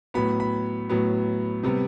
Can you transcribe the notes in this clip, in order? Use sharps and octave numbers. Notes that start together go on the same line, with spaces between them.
A2 F#3 B3 B5
B5
A2 F#3 B3
C3 G3 B3